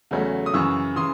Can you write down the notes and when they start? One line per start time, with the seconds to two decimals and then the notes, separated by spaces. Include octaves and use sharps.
0.11 E2 C#3 F#3 A3
0.46 D#6
0.54 F#2 C#3 E3 C#6 E6
0.96 C#3 E3 C6 D#6